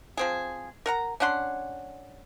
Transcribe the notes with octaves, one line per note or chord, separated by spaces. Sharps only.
F3 C4 G#4
A#4 F#5 A#5
C#4 D4 F#5 C6